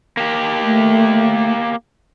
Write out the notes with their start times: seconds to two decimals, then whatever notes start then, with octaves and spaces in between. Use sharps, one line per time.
0.17 A#3 G4
0.63 A3